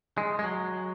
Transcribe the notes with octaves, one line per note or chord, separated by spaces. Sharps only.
G#3
G#3
F#3